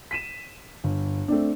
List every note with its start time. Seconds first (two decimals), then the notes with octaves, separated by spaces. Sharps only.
0.11 B6 D#7 E7
0.84 G1
1.28 A3 C4 D4